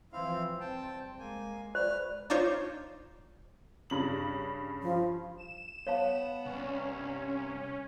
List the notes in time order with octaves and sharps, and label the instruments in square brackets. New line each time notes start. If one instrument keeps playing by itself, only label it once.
[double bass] E3 F3 [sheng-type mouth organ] C4 E4 F5
[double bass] C2 C4 [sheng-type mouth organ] G5 A5
[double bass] G#3 [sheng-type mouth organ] A#3 G#5
[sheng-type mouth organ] B4 F6 [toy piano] C5 [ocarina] D5
[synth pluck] D4 D#4 F4 C5 C#5
[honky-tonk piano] G2 C#3 F#7
[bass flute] F3
[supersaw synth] E7
[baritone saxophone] B3 [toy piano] C#5 F5 A5
[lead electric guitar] C2 [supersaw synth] C#4
[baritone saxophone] G2